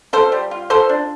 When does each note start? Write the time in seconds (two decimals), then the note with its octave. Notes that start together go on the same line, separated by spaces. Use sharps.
0.13 F4 A4 C5
0.32 G3
0.51 F4
0.70 F4 A4 C5
0.89 D4